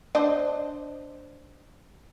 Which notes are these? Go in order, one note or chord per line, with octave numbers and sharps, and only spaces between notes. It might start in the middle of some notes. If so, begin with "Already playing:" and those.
D4 C5 D#5